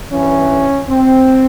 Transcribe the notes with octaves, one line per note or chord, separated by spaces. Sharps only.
G2 E3 C#4
C4